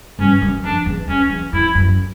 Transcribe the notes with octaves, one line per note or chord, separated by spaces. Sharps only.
G2 C#4
F#2
F2 D4
E2
E2 C#4
E2
F2 E4
F#2